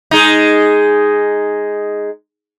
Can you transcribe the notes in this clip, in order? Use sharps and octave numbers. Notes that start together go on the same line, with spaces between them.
G#3 D#4